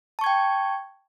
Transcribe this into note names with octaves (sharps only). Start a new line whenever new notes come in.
G5 A5 C#6 G#6